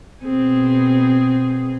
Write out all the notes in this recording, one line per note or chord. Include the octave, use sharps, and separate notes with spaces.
B2 C4 G#4